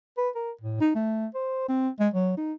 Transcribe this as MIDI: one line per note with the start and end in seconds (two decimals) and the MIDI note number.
0.17 0.29 71
0.35 0.51 70
0.61 0.79 45
0.81 0.90 63
0.95 1.26 57
1.34 1.68 72
1.68 1.89 60
2.00 2.09 56
2.14 2.36 54
2.37 2.53 63